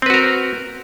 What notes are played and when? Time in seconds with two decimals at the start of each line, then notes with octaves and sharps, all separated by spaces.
0.02 C4
0.06 B4
0.10 F#4
0.14 A#4